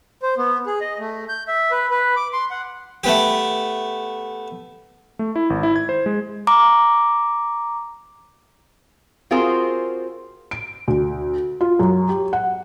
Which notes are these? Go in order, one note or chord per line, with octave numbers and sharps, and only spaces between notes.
C5
B3
G#4
D#5
A3
G6
E5
B4
B4
D6
C6
F#5
A3 B3 G4
A3
E4
G#1
E4
G#6
C5
G#3
A#5 D6
C4 F4 F#4 G#4 A#4 C5
D7
D2
F4
F#2
G4
F#5